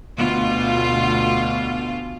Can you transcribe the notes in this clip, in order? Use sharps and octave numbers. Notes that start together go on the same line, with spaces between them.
D2 B2 F4